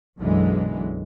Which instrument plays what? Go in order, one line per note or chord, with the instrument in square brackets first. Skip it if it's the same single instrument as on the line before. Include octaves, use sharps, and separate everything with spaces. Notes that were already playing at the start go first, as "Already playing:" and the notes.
[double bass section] B1 F#2 D3 E3 F#3 G#3